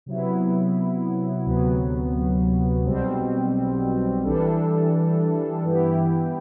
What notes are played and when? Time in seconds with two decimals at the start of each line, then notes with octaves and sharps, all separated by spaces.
0.06 C3 F#3 B3 E4
1.46 D2 C3 F#3 B3
2.85 B1 B2 G3 C4
4.24 E3 G3 D4 A4
5.63 G2 E3 B3 E4 G4